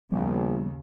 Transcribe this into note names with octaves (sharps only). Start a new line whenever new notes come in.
A#1 D#2 C#3 F3 G3 B3